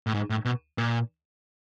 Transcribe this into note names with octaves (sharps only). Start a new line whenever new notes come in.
A2
G#2
A2
B2
A#2